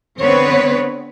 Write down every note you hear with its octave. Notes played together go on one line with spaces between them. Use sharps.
D3 B3 C4 B4 C#5